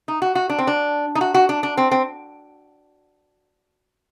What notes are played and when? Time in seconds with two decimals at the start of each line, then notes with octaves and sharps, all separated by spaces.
0.08 D#4
0.22 F#4
0.35 F#4
0.50 D4
0.59 C4
0.67 D4
1.15 D#4
1.21 F#4
1.34 F#4
1.49 D4
1.63 D4
1.77 C4
1.91 C4